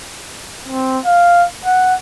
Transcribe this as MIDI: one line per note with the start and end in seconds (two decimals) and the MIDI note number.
0.69 0.99 60
1.06 1.45 77
1.66 1.95 78